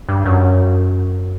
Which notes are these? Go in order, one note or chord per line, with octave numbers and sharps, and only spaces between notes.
G2
F#2